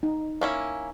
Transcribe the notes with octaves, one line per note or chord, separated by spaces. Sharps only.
D#4
A#3 C#4 E4